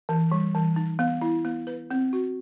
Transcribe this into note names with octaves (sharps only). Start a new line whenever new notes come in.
E3
G3
E3
D#4
B3
E4
B3
B4
C4
F#4